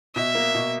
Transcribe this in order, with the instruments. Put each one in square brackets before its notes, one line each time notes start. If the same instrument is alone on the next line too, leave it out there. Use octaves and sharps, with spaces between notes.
[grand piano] B2 [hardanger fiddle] E5
[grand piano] A#3
B2